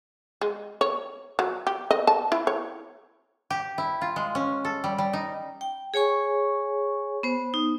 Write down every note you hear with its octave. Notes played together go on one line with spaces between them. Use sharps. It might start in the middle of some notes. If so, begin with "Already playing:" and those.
G#3
C#5
F#3
G4
D#5
A5
E4
C#5
G4
E4
F4
G#3
C#4
A4
G3
G3
D#4
G5
G#4 C#5 G#5 C#6
B3 C5
D#4